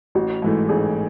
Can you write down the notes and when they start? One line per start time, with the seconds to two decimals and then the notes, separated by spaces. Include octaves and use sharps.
0.15 A1 F#4
0.42 G#2 E3 A3
0.69 A1 G#4